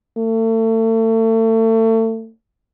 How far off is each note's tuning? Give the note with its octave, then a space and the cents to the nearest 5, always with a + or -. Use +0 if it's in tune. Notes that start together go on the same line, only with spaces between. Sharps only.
A3 +35